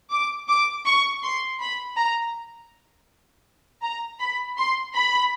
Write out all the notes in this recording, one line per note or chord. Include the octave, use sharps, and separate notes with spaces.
D6
D6
C#6
C6
B5
A#5
A#5
B5
C6
B5